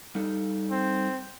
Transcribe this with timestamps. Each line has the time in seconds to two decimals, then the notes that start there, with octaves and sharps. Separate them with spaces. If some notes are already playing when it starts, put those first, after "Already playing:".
0.15 G3 D#4 A4
0.71 C4